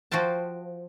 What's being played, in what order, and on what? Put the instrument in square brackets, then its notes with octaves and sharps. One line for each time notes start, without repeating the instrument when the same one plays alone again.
[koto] F3 F#4 C5 G5 A5